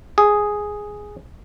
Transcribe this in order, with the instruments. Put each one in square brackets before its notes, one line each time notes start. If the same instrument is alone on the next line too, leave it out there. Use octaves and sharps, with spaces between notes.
[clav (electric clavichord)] G#4